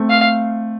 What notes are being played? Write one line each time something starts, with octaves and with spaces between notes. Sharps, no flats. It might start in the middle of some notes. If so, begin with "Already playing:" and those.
Already playing: A3 C4
F5